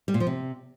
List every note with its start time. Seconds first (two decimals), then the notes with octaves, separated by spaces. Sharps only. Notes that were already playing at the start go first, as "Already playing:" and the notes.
0.08 G3
0.14 A#2
0.20 F3
0.27 C3